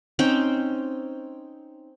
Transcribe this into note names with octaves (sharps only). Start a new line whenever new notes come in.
C4 C#4 D#4 G5